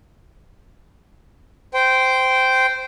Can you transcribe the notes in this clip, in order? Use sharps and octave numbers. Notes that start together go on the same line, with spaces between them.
C5 G5